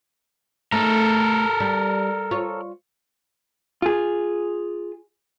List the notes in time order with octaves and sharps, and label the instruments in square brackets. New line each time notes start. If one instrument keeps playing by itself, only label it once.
[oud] A3 D#4 [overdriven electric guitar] A4 A#4
[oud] G3
F4 C#5
[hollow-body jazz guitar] F4 G#4